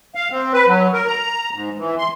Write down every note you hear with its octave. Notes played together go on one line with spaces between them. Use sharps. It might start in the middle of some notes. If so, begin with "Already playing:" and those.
F5
C4
B4
F#3
A#4
A#5
G#2
E3
C6